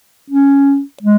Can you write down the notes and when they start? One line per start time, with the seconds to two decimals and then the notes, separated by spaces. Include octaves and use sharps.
0.30 C#4
1.03 G#3